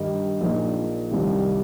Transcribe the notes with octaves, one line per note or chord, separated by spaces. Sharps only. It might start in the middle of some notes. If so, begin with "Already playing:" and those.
Already playing: G2 D#3 G3 D#4
A#1 A#2 A#3 D#4
C2 C3 D#3